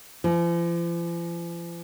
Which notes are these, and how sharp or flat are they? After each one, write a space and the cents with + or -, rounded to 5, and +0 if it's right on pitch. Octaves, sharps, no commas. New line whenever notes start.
F3 -45